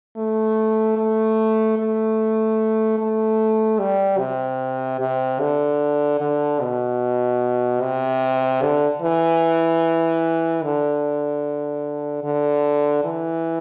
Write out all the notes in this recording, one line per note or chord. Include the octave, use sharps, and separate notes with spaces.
A3
A3
A3
A3
G3
C3
C3
D3
D3
B2
C3
D3
E3
D3
D3
E3